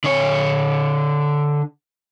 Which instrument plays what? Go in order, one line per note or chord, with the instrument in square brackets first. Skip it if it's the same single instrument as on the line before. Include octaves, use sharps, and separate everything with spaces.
[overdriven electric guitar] D3 C#5